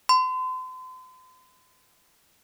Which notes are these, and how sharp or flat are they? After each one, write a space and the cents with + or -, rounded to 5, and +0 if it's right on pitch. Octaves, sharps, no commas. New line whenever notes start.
C6 -40